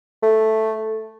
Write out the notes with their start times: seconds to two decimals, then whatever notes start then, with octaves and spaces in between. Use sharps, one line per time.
0.23 A3